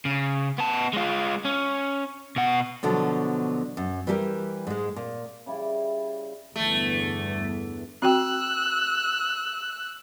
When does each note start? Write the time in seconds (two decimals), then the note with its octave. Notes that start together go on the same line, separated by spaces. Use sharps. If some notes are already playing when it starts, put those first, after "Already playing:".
0.05 C#3
0.58 B3 A5
0.93 G#3 F4
1.45 C#4
2.36 B2 F#5
2.83 B2 D3 F3 F#3
3.77 F#2
4.07 E3 G3 G4 A4 A#4
4.67 G#2 G#3
4.96 A#2
5.46 C#3 G3 E4 D5
6.56 G1 E2 E3 A3
8.02 C4 F#4 G5 E6 F#6